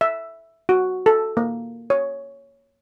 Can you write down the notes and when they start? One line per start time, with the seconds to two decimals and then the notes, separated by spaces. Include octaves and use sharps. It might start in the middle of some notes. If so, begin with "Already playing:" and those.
0.01 E5
0.69 F#4
1.06 A4
1.37 A#3
1.90 C#5